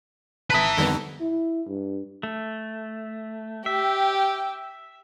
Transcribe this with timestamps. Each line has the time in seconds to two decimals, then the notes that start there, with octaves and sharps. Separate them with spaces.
0.50 G#1 B4 E5 A5 A#5 D#6 B6
0.77 F2 D3 D#3 G3 B3
1.21 E4
1.67 G2
2.23 A3
3.66 G4 E5 G5